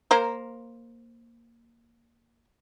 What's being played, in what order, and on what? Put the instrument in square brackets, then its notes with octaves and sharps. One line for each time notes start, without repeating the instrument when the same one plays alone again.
[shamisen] A#3 A#4 C5